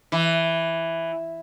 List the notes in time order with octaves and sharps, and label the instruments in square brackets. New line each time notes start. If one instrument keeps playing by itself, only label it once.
[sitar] E3